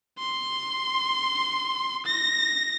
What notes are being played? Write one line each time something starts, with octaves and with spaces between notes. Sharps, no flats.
C6
A#6